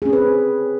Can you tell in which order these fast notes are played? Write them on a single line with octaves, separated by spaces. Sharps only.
G#4 C#4 C4 B4